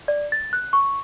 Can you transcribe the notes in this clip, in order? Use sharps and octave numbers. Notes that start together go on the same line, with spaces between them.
D5
A6
F#6
C#6